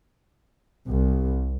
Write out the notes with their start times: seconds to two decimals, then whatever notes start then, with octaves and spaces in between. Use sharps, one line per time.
0.87 C2